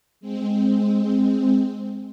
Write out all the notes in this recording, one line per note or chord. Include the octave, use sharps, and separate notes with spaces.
G#3 C4